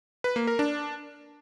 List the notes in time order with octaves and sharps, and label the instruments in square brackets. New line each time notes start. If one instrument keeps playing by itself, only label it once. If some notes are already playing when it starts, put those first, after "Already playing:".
[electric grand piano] B4
A#3
A#4
D4